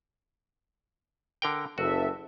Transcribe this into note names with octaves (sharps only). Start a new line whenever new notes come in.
D3 A#4 G5
F#1 F#4 A4 E5